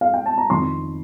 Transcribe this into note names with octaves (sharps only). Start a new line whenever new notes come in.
F5
G5
A5
A#5
F2 D#3 C6